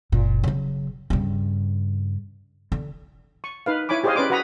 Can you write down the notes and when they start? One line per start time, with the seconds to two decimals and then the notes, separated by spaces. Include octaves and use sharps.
0.12 F#1 A#2
0.44 C#3 F#3
1.10 G2 C#3
2.72 D3
3.44 C#6
3.66 D#4 B4 F5
3.89 E4 C#5 G#5 B5 D6
4.04 G4 G#4 C5 C#5 D#5 F5
4.16 C#4 B4 D5 C6 D6
4.30 F#4 B4 F#5 A#5 B5 D#6